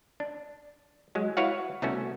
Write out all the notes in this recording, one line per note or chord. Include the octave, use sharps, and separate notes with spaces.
D4
F#3 G#3
E4 F#4 B4 C#5 F5 F#5
C2 A3 B3 C#4 F#4